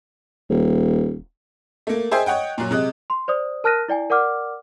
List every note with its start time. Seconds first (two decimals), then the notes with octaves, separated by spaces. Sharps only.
0.50 D#1
1.87 A3 A#3
2.11 G#4 C5 D#5 E5 G5 G#5
2.26 C#5 D#5 F#5 G5
2.58 A#2 F#3
2.71 C3 G#3 D#5 F#6
3.10 C6
3.28 C5 D5 D#6
3.64 A#4 A5 F6 F#6 A#6 D#7
3.88 E4 D5 G5 G#5
4.10 A#4 D5 F#5 D6 F6